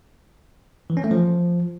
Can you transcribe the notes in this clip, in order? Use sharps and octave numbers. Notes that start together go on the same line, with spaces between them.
E3
C#4
A3
F3